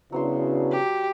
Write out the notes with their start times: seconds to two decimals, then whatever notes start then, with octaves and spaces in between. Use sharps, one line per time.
0.12 C#3 F#3 B3 D4 E4 C5 C6
0.72 G4